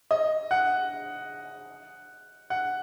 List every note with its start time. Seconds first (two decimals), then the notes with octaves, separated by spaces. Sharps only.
0.11 D#5
0.51 F#5
2.50 F#5